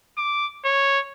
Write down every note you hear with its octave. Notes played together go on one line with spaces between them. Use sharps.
D6
C#5